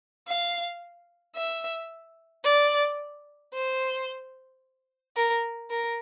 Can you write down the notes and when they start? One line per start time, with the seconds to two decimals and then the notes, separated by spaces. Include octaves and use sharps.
0.27 F5
1.36 E5
2.44 D5
3.53 C5
5.16 A#4
5.70 A#4